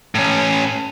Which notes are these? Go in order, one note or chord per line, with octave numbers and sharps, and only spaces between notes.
A2 C#4